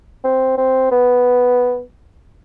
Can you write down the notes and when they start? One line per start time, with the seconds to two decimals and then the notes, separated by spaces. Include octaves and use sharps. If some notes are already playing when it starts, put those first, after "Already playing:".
0.24 C4
0.57 C4
0.91 B3